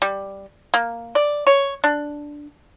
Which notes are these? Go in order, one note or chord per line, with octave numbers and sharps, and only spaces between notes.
G3
A#3
D5
C#5
D4